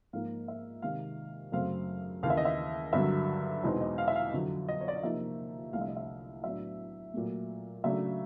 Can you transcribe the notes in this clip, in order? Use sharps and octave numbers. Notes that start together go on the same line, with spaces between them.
G#2 F3 A#3 D#4 F5
E5
C3 D#3 G#3 F5
F#2 C#3 F#3 A3 C4 F5
D#2 C#3 E3 F5
E5
D#5
E5
G2 D3 F#3 E5
E2 B2 G#3 C4 D#4
D#5
F5
E5
F5
F2 D3 F#3
D#5
C#5
D5
D#5
C3 F3 A#3 D#4 E5
C2 C3 F3 A3 D4 F5
E5
D#5
E5
A2 F#3 B3 D4 E5
A#2 F#3 A3
C#3 F#3 A3 D4 E5